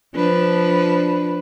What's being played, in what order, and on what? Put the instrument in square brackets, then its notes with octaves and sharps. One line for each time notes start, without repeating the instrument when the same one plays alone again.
[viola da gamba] F3 D4 B4